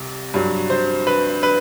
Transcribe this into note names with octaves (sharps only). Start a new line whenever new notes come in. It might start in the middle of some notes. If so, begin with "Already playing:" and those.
Already playing: C2 C3
G2 F#3
C5
B4
B4